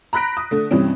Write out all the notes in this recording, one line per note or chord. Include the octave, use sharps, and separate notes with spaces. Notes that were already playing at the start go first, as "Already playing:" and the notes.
A#5 B5 F#6 A#6 B6 D7
D#6
D3 A3
G2 C3 E3 C4 C#4